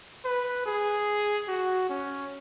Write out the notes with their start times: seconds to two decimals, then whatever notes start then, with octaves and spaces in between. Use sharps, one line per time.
0.25 B4
0.66 G#4
1.48 F#4
1.89 C#4